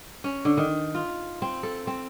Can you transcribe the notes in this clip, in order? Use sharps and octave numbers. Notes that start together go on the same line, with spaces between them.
C#4
D3
D#3
F4
C4
A4
C4